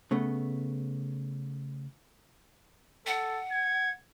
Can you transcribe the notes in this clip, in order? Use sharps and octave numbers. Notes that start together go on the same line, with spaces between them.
C#3 A3 B3
A4 F#5
G#6